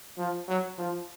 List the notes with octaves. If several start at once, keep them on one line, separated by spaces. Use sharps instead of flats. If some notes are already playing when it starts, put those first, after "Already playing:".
F3
F#3
F3